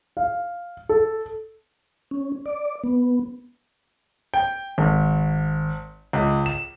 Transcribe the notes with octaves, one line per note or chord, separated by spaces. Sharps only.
F5
A4
C#4
D5
B3
G5
G#1
C#2
E7